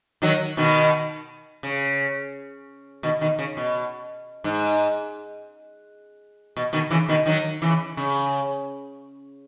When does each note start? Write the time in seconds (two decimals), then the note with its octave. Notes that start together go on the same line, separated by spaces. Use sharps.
0.22 D#3 F#3
0.57 B2 D#3
1.63 C#3
3.03 B2 D#3
3.21 B2 D#3
3.39 C#3
3.57 B2
4.44 G#2
6.57 B2
6.73 B2 D#3
6.91 C#3 E3
7.09 B2 D#3
7.26 D#3 F#3
7.62 C#3 E3
7.97 C#3